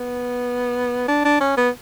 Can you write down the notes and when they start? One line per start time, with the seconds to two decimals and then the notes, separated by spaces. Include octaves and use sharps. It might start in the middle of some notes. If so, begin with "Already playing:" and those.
Already playing: B3
1.08 D4
1.25 D4
1.41 C#4
1.57 B3